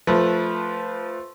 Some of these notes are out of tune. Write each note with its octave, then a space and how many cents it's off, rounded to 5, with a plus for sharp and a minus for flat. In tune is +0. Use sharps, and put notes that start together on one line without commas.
F3 +0 A3 +0 B4 -15